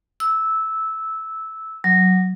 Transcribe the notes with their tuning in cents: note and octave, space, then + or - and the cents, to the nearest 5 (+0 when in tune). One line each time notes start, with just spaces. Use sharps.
E6 -10
F#3 +5